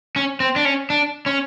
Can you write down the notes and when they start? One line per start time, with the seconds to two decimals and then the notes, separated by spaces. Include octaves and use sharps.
0.16 C#4
0.40 C4
0.56 D4
0.65 C#4
0.90 D4
1.26 C#4